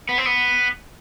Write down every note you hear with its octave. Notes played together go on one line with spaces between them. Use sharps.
B3
C4
B3